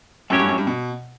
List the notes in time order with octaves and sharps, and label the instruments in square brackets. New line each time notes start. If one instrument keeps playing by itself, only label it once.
[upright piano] F#2 [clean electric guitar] A2 F#3 C#4 G4 C#5
[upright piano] G2
F#2
G2
B2